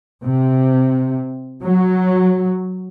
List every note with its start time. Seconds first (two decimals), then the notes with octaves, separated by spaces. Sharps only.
0.24 C3
1.64 F#3